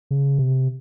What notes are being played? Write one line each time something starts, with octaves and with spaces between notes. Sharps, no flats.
C#3
C3